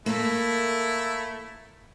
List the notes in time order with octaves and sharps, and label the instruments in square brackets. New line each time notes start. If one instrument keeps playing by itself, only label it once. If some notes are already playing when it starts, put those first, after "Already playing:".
[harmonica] A3 E4 [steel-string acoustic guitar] A#3 A4